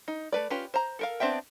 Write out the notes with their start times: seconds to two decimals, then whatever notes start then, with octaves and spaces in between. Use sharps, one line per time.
0.08 D#4
0.33 A3 B4 D5
0.50 C#4 F4 G4 B4
0.74 C5 A#5
0.99 A4 A#4 F5
1.20 B3 C4 D4 E5 G5